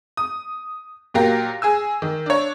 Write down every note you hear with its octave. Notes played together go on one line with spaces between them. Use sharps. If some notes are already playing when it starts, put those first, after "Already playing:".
D#6
A#2 F#3 G4 A#4 F5 A#6
G#4 G#5 E6
D#3
D4 C#5